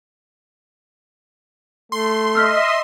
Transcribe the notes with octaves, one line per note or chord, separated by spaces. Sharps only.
A3 C6
D#5 E5 E6 F6 B6